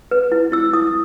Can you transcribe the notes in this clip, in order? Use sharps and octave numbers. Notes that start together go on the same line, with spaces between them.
B4
E4
E4 E6
E4 D#6